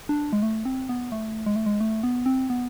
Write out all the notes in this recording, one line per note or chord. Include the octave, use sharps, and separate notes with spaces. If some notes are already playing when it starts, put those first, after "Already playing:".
D4
G#3
A3
C4
B3
A3
G#3
A3
G#3
A3
B3
C4
B3